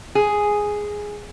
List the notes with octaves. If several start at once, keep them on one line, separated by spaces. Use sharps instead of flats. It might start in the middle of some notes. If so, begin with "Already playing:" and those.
G#4